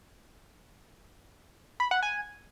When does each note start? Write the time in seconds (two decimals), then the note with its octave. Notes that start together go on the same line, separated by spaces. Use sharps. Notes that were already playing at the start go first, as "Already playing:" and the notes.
1.80 B5
1.91 F#5
2.03 G#5